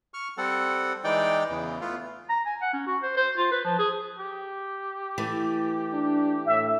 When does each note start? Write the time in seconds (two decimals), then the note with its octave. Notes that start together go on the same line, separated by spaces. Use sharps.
0.14 C#6 F6
0.38 G3 C4 A4 F#5
1.04 E3 G#3 D#4 D5 G5
1.50 E2 C#3 E3
1.81 A3 B3 F4
2.29 A#5
2.46 G#5
2.62 F#5
2.73 C#4
2.87 F#4
3.03 C5
3.17 C5
3.37 F4
3.52 B4
3.65 F3
3.79 G#4
4.18 G4
5.18 E3 A3
5.93 D4
6.46 A2 E5